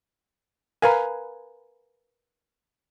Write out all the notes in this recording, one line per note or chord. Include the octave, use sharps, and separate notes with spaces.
A#4 B4 F5 G#5 A#5